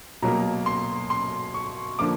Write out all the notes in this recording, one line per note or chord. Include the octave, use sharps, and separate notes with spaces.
B2 F#3 A#3 A#5
C6
C6
C#6
D3 F3 A#3 D6